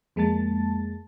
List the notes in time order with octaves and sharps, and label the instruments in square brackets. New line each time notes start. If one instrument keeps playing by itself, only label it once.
[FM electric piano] F2 G#3 A#3 A5 A6